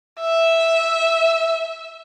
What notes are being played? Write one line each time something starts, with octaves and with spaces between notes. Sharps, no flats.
E5